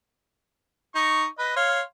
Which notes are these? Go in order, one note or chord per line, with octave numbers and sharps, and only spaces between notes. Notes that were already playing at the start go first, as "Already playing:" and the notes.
D#4 C#6
B4 D#5
C#5 F5 C6